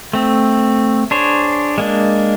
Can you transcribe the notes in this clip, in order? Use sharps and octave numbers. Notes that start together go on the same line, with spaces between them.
A3 C4
D4 G#4 C5 C#5
G#3 A#3 D4